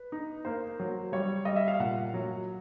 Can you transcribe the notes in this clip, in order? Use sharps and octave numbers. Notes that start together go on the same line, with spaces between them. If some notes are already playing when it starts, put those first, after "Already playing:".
Already playing: B4
D#4
A#3 C5
F#3
G3 C#5
G3 D#5
E5
F5
A#2 F#5
F#3